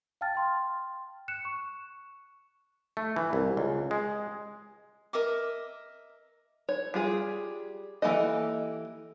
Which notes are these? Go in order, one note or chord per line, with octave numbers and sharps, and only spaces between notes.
F5 G5 A5 F6 A6
G5 C6
F#6 C#7 E7
C#6
A3
E3
C2
C#2
G#3
A#4 D#5 E5 D6
C#5
G3 F4 G#4
E3 A#3 G4 A4 D#5